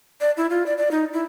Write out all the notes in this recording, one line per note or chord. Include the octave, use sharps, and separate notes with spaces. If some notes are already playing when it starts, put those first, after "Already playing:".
D5
E4
F4
D5
D5
D#4
E4